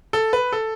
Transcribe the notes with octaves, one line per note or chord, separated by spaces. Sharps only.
A4
B4
A4